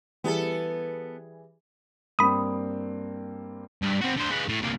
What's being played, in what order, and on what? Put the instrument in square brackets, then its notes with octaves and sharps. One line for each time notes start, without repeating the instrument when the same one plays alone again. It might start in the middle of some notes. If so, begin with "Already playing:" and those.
[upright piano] E3 G3 G#4 [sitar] B3 A4
[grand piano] G2 A#3 C4 [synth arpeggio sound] B5 D#6
[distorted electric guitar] G2
C4 F#4
D3 C5
G#3 B4
A2
C2 A#3